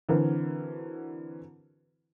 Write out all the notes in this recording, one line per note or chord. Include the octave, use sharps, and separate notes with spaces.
D3 E3 F#3 C4 F#4 A#4